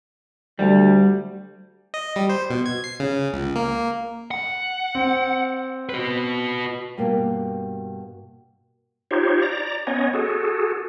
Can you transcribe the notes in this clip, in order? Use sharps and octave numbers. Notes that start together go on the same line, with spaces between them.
D2 G3
D#5
G3
C5
B2
G#6
C7
C#3
C#2
A#3
F#5
C4
F#4 B4
G2 B2 A#3
D#4 F4 G4 C5 C#5
D5 A#5
B3 C#4 C#5 D#5
F#4 G#4 A4